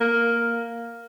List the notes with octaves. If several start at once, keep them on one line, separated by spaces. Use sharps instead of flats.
A#3